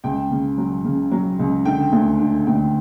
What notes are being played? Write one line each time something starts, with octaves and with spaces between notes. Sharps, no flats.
C#2 G5
C#3
F#3
C#3
F#3
C#2
D3 G5
D2
D3
D2 G5